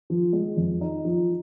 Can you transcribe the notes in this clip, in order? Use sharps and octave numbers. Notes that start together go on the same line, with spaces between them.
F3
G#3
F2
D#4
F3